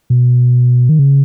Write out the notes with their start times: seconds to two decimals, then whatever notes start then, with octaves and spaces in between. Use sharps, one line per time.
0.10 B2
0.89 D#3
0.99 C#3